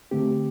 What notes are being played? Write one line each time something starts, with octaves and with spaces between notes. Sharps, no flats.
D3 A3 C4 G4